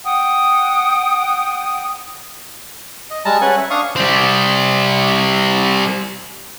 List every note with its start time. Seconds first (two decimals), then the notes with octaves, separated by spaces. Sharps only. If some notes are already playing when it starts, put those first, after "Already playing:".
0.05 F#5 G5 D#6
3.10 D#5
3.25 G3 G#3 A5 A#5
3.41 C#4 B4 F#5 G#5
3.57 E5
3.70 D4 F5 C#6 D#6
3.96 G3 C4